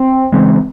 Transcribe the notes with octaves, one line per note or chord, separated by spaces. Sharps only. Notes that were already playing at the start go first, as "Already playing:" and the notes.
Already playing: C4
C#3 E3 G#3 C4